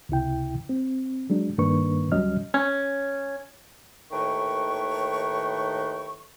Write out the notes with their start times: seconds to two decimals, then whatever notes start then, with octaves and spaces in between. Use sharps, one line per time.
0.09 C#2 C3 E4 G5
0.69 C4
1.30 F#3 G#3 D4
1.58 G2 D#3 A#3 D4 B4 C#6
2.12 D2 F#3 G3 C#4 D#5 F6
2.54 C#4
4.11 D#2 A2 D#3 B4 G5 C#6